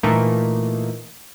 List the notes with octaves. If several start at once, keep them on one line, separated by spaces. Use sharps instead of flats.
A#2 E3 A3 A#3 D#4